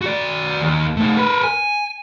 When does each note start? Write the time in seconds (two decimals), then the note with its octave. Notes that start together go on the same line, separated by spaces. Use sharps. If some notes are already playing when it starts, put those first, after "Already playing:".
0.02 F#4 D5
0.62 D#2
0.97 A3 D#4
1.17 A#4 B4
1.44 G#5